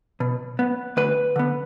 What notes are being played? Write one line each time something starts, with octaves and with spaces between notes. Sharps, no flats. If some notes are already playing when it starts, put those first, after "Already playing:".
B2
B3
D2 B4
D3 B3